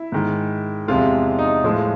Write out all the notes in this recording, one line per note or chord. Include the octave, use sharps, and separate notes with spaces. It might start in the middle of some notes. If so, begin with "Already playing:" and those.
Already playing: E4
G#2 D#3 G#3
E2 C3 F3 G#3 F4
D#4
A2 F3 G#3